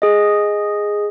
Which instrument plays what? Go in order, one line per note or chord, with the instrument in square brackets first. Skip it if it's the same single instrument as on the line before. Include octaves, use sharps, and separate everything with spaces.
[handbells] G#4 D#5